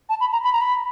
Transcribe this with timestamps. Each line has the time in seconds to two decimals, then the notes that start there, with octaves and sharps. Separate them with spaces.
0.09 A5
0.21 B5
0.32 A#5
0.44 B5
0.53 A#5
0.61 B5